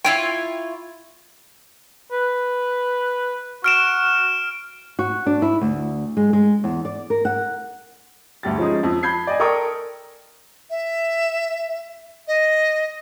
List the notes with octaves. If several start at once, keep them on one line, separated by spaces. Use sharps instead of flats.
E4 F4 C#5 G5 D7
B4
F#4 F6 D7 E7
F#4
D4
E4
D2
G#3
G#3
E2
D5
A#4
F#5
D2 G2 G3 G4 A6
F3 G#3 C#4 D#4 G#4
F2
A5 B5 G6 G#6 C7
D5 D#5 G#5
A4 A#4 D5 G5 C#6 D#6
E5
D#5